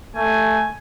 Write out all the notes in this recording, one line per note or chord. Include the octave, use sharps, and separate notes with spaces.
A3 G#5